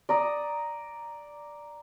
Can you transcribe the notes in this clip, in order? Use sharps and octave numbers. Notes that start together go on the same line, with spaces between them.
D5 A#5 D#6